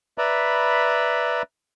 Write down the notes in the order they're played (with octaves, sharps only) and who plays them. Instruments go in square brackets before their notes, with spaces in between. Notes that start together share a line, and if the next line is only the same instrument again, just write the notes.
[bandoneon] B4 D5 E5 A#5 B5